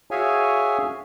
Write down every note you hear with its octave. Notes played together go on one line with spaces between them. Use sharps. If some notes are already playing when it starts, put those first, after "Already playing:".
F#4 G#4 C#5 E5 F5 G#5